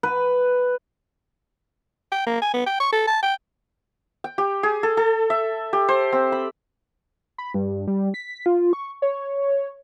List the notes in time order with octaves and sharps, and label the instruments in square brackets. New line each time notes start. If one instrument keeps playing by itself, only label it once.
[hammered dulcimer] B4
[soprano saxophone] G5
A#3
G#5
B3
G5
C#6
A4
A5
G5
[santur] G5
G4
G#4
A4
A4
E5
G4
C5
C4
B5
[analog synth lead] B5
G2
G3
B6
F4
C#6
C#5